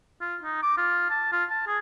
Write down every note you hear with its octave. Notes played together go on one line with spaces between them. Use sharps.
F4
D#4
D6
F4
A5
F4
A5
G#4